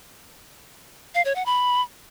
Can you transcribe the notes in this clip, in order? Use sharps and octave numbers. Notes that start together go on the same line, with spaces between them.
F5
C#5
F#5
B5